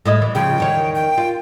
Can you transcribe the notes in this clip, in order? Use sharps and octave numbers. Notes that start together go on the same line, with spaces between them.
A2 E4 D#5
E3
C#3 F3 G5
E2 D#3 C#5
G5
F4